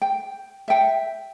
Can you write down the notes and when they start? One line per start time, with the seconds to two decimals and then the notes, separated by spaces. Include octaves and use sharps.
0.02 G5
0.68 E5 G5